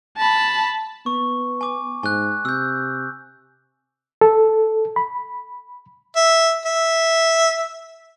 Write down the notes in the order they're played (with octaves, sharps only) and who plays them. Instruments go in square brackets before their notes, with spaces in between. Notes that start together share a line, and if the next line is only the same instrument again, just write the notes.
[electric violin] A5 B5
[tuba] B3 [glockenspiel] C#6
[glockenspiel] G#5 D6
[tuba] G#2 [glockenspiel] G#5 F#6
[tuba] C3 [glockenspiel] E6 G6
[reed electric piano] A4
B5
[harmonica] E5
E5